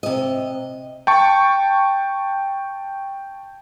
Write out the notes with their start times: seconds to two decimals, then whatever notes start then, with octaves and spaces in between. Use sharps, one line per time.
0.03 C3 D#5
1.07 G5 A5 C#6